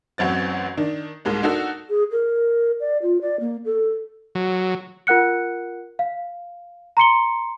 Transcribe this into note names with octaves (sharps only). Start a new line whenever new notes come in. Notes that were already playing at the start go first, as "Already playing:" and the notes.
A1 F#2 F#3 C4 A6
D#3 D4
C2 G#2 G#3 A#3
D4 D#4 F#4 A4 A#4
G#4
A#4
D5
F4
D5
A#3
A4
F#3
F4 A#4 F#5 F#6 C#7
F5
A#5 C6 C#7 G7